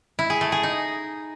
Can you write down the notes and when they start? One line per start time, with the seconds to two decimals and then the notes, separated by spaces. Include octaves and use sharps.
0.19 E4
0.30 G#4
0.41 A3
0.52 G#4
0.63 D#4